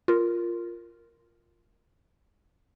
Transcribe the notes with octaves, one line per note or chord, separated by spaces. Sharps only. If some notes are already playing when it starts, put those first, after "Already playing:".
F4 A#4